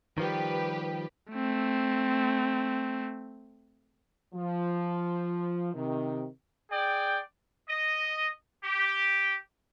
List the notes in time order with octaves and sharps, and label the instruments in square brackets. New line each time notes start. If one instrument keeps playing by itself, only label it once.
[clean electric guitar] D#3 F3 G3 [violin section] G4 B4
[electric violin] A3 C4
[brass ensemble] F3
C3 D#3
[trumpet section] G#4 D5 G5
D#5
G4